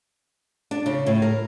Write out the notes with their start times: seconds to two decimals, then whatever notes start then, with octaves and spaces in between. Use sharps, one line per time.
0.71 D4
0.86 C#3
1.06 A2
1.22 A#4